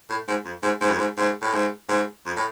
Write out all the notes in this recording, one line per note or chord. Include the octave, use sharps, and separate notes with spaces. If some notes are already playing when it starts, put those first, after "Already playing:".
A2
G#2
F2
G#2
G#2
F2
G#2
G#2
A2
G#2
G#2
F2
A2